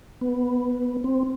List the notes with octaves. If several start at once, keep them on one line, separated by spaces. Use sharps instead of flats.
B3
C4